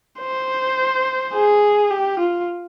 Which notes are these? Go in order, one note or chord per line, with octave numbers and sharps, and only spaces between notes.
C5
G#4
G4
F4